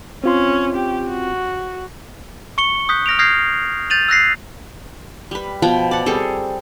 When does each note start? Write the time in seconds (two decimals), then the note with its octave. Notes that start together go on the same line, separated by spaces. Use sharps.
0.24 C4 C#4 F4 C6
0.75 G4
1.08 F#4
2.58 C#6 C#7 G7
2.89 D#6 F#6 G6 B6
3.06 F6 A#6 D7 F7
3.19 D#6 F6 G6 G#6 A#6 C7
3.90 G6 A6 D#7 F7 F#7
4.08 E6 F#6 A#6 C7
5.31 G3 B4
5.62 B2 F3 B3 G5
5.91 D5 F#5
6.06 G3 C4 G#4 A4